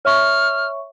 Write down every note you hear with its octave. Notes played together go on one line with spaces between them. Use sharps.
C#5 E5 C#6 F6